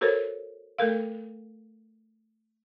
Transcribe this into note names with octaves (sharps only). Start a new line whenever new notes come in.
F#4 A4 A#4 C5 C#5
A3 A4 A#4 F5